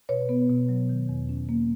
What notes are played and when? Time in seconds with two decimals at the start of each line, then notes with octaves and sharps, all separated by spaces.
0.09 B2 B4 C#5
0.29 B3
0.49 B2
0.69 F#3
0.89 D#3
1.09 E2
1.29 C#4
1.49 A#3